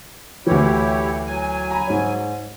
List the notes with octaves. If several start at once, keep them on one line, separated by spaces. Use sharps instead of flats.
D2 E3 E4 G4 C#5
F#3 G#5
A#5 B5
G#2 C#5